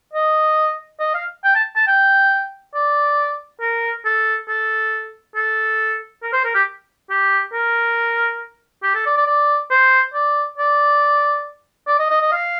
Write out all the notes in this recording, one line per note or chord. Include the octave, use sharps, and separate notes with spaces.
D#5
D#5
F5
G5
A5
A5
G5
D5
A#4
A4
A4
A4
A#4
C5
A#4
G4
G4
A#4
G4
A4
D5
D5
D5
C5
D5
D5
D5
D#5
D#5
D#5
F5